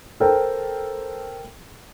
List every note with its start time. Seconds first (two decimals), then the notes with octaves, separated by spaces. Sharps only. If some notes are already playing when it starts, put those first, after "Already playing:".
0.20 A4 A#4 C5 G5